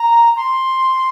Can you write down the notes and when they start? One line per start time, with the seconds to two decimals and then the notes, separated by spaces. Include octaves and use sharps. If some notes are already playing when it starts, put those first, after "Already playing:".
Already playing: A#5
0.36 C6